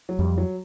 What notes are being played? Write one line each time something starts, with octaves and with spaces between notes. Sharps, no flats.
F#3
F2 G3
F#3